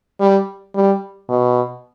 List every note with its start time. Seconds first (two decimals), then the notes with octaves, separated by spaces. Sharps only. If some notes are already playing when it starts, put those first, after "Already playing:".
0.20 G3
0.75 G3
1.29 B2